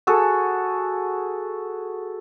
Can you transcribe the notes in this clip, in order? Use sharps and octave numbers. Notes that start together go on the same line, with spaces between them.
F#4 G#4 A4